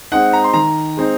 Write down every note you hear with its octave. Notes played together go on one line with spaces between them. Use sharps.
G#3 C4 D#4 F#5
A#5
C6
D#3 A#5
G#3 C4 D#4